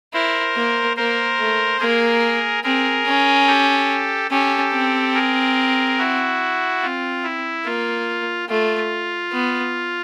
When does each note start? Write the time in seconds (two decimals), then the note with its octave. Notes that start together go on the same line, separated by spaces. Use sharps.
0.13 E4 A#4 C5
0.55 A#3
0.96 A#3 A#4 C5
1.39 A3
1.79 A#3 G#4 A#4
2.63 C4 G#4 A#4
3.05 C#4
3.47 G4 A4
4.30 C#4 G4 A4
4.73 C4
5.14 G#4 A#4
5.98 E4 F#4
6.81 C4 F4
7.23 E4
7.65 A#3 F4
8.49 A3 F4
9.32 B3